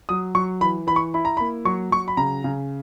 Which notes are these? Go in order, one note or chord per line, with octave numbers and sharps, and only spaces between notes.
F#3 D#6
F#3 C#6
E3 B5
E3 B5
C#6
E4 B5
A#5
A#3 B5
F#3 C#6
F#3 C#6
B5
C#3 A#5
C#3